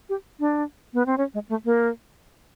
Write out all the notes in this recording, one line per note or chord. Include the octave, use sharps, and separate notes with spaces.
G4
D4
B3
C4
C#4
G#3
A3
A#3